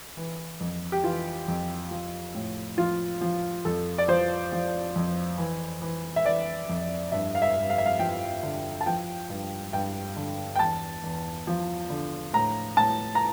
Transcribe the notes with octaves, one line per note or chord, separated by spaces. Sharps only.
E3
F2
G4
E3 F4
F2
F3
A2
F3 F4
F3
F2 A4
D5
F3 C5
F3
F2
E3
E3
E5
E3 D5
F2
G2 E5
F5
E5
G2
F5
E5
F5
F3 G5
D3
A5
F3 G5
G2
G2 G5
D3
G5
E2 A5
E2
F3
D3
A2 A#5
A2 A5
A#5